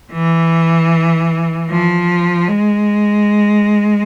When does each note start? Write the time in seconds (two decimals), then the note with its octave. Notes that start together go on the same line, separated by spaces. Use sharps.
0.12 E3
1.70 F3
2.48 G#3